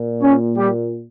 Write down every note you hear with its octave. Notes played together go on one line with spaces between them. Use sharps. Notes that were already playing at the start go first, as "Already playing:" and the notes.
Already playing: A#2
C#4 C#5
G3 G4